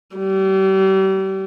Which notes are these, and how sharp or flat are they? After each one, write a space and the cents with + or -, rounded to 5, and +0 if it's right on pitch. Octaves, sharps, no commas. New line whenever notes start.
G3 -35